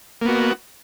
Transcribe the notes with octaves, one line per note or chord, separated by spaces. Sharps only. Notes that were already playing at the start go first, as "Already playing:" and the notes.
A#3 B3 F#4